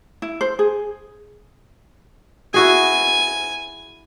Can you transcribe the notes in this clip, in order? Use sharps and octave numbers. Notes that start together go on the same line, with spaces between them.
E4
C5
G#4
E4 F#4 G#4 G#5